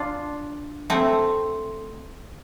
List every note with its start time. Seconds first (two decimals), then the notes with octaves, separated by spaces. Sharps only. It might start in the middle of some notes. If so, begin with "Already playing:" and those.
Already playing: D4 F4
0.90 A3 C4